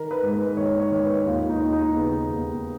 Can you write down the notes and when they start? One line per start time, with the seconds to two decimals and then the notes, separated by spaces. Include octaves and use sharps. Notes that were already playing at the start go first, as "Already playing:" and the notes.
Already playing: D#3 A#4
0.11 B4
0.23 G#2
0.34 B4
0.57 D#3 C#5
0.79 C#5
0.91 D#3
1.03 B4
1.26 D#2 F4
1.49 D#4
1.60 D#2
1.72 D#4
1.95 C#3 B3
2.29 D#2